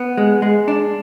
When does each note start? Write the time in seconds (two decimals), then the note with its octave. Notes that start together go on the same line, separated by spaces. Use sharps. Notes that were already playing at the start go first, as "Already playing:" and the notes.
Already playing: B3
0.17 G#3
0.42 G#3
0.68 D4